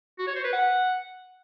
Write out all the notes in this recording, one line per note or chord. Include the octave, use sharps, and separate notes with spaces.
F#4
C#5
C5
B4
F#5